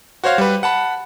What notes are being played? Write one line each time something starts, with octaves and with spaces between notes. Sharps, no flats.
F#4 C5 C#5 F5
G3 B4
F#5 A5 B5